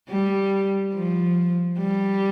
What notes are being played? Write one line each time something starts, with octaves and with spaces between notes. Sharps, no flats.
G3
F3
G3